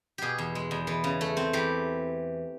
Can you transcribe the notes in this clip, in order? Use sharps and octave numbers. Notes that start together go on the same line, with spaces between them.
B2 G4 G#4
E2
G#3
E2
E3
C#3
A3
C4
E3 G4